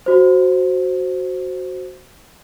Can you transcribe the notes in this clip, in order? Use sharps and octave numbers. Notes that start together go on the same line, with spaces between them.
F#4 C5